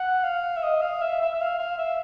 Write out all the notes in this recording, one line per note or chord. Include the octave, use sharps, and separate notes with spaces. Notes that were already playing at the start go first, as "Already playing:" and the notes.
Already playing: F#5
F5
E5
D#5
F5
E5
E5
E5
F5
F5
E5